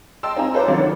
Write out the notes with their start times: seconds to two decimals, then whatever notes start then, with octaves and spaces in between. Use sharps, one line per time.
0.23 D#5 G5 A5 C6 E6
0.36 C4 D#4 F4 D#5 G#5 A#5
0.54 A4 B4 C5 A#5 D6
0.65 G#1 F#3 C#4 F4 D5
0.78 D#3